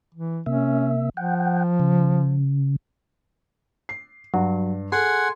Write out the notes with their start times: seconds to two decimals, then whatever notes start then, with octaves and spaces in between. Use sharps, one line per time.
0.15 E3
0.46 C3 A#3 C#4 E5
1.17 F3 F#5 G5
1.80 C#3
3.89 C7
4.34 G2 F#3
4.92 G#4 A4 F#5 G#5 C6